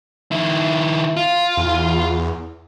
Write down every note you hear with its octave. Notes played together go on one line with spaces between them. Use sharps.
D#3 E4
F4
E2